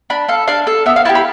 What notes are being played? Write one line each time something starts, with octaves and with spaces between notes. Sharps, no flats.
D4 B5
A4 F5
D4 F5
A4
B3 E5
F5
E4 G4 A5
B5